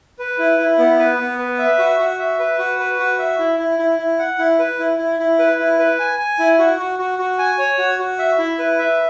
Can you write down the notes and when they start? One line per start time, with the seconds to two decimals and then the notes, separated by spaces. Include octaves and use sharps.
0.19 B4
0.39 E4
0.59 E4
0.79 B3
0.99 B4
1.18 B3
1.38 B4
1.59 E5
1.79 F#4
1.99 F#4
2.19 E5
2.39 B4
2.59 F#4
2.79 B4
2.99 F#4
3.19 E5
3.39 E4
3.59 E4
3.79 E4
3.99 E4
4.19 F#5
4.39 E4
4.59 B4
4.79 E4
4.99 E4
5.19 E4
5.39 B4
5.59 E4
5.79 B4
5.99 G#5
6.19 G#5
6.39 E4
6.59 F#4
6.79 F#4
6.99 F#4
7.19 F#4
7.39 G#5
7.59 C#5
7.78 F#4
7.99 F#4
8.19 E5
8.39 E4
8.59 B4
8.79 E5